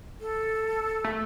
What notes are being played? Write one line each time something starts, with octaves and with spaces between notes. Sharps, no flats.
A4
A3